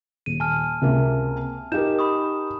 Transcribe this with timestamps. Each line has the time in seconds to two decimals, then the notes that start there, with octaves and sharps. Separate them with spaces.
0.26 D#1 D#7
0.40 G#5 A5 F6
0.82 C#2 C3 A#3
1.72 D#4 G4 A#4 G6 E7
1.99 B5 C#6 D#6